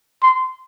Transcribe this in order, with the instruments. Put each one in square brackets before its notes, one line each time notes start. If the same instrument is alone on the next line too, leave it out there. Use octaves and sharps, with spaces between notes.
[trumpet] C6